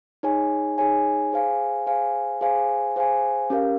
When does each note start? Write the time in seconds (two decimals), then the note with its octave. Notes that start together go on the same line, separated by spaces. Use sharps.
0.23 D#4 G#4 C#5 G#5
0.78 D#4 G#4 C#5 G#5
1.33 G#4 C5 F5 G#5
1.86 G#4 C5 F5 G#5
2.41 G#4 C5 F5 G#5
2.96 G#4 C5 F5 G#5
3.50 C#4 G4 A#4 F5